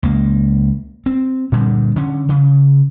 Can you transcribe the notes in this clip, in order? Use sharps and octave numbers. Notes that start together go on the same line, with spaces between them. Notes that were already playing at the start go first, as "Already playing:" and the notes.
C#2 A#3
C4
G2 A#2 D3 G3
D3 C#4
C#3